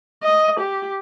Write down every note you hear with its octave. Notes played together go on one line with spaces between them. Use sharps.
D#5
G4